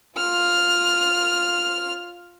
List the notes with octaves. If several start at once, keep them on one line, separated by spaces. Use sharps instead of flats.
F4 F6